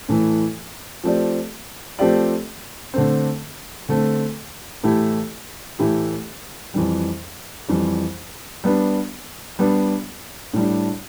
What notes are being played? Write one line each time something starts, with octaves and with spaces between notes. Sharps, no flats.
A2 E3 A3
F3 A3 C4 G4 D5
F3 A3 C4 G4 D5
D3 A3 C4
D3 A3 C4
A2 E3 A3 E4 G4
A2 E3 A3 E4 G4
F2 E3 G3
F2 E3 G3
G3 B3 D4
G3 B3 D4
A2 G3 D4